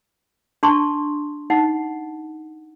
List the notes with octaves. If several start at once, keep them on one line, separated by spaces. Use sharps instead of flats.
D4 A5 C6 C#6
D#4 F#5